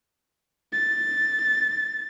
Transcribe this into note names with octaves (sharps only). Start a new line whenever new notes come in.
A6